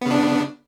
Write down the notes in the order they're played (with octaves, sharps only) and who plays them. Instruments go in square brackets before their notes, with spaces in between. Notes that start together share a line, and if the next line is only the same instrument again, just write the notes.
[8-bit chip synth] B3
C#3
D4